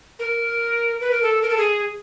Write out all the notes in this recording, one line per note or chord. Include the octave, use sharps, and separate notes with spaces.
A#4
B4
A#4
A4
A#4
A4
G#4